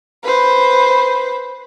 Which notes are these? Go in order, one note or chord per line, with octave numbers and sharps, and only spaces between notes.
B4 C5